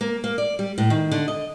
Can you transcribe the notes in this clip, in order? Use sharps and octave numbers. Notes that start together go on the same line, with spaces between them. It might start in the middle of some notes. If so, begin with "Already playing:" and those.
A#3
A#3
D5
G3
A2
D#3
D3
D#5